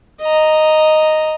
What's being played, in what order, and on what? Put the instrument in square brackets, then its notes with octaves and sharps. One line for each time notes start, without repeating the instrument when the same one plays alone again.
[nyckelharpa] D#5 A#5